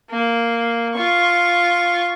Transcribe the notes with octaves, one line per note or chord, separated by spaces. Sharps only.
A#3
F4 C#6